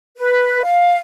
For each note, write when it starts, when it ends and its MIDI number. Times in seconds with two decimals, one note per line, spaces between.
0.17 0.61 71
0.63 0.99 77